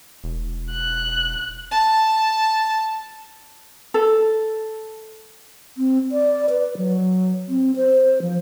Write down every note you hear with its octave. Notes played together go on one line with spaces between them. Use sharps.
E1
F#6
A5
A4
C4
D5
B4
F#3
C4
C5
F3